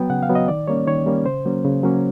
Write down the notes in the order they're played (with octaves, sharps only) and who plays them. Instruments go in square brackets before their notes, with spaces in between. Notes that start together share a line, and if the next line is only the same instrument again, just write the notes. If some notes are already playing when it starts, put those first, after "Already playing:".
Already playing: [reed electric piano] F#3 B3 G5
C#3 F#5
F5
F#3 B3
D#5
D#3 D5
G3 A#3 C#4 C#5
D#3 C#5
G3 A#3 C#4
C#3 C5
F#3 A#3 C#4
C#3
F#3 A#3 C#4